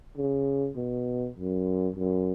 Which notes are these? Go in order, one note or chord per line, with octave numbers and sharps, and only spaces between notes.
C#3
B2
F#2
F#2